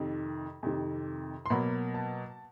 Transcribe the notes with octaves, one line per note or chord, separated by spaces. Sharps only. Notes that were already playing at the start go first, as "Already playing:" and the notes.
Already playing: F2 C3 D#3
F2 C3 D#3
C6
B2 F#3 A#3 B5
A5